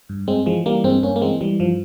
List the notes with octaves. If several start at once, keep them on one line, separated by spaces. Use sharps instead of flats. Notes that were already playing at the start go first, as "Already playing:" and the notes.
G2
G2 G#3 C4
E3 F3 G#3
E3 G3 A#3
G2 G#3 C4
G2 A#3 C#4
A#3
E3 G#3 C4
E3 G3
G2 F3